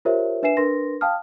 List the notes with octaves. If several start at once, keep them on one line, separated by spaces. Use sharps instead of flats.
F4 G4 A#4 C5 C#5 E5
D4 B4 E5 G#5 C7 E7
D4 A#4 B4 C6 A#6
F5 G5 A5 D#6 F6